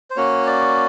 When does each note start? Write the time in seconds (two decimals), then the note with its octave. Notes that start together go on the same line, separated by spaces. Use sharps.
0.10 C5
0.16 A#3 C#4 F#4 C#5
0.47 D5